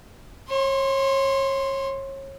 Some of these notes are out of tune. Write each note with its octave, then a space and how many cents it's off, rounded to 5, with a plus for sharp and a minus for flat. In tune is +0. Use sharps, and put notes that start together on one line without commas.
C#5 -30 C6 +0